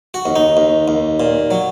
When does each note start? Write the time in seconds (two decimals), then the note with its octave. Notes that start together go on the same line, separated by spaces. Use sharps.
0.14 F#4
0.26 D#2
0.36 D#4
0.57 D#2
0.88 D#2
1.20 A#2
1.51 F#3